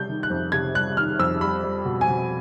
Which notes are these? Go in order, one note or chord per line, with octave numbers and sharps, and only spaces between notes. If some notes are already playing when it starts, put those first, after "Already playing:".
Already playing: C3 G3 G6
D#3
F#6
F2
C3 G#6
G3 F#6
D#3 F6
F2 E6
G3 B5
G3
B2
G#5
B2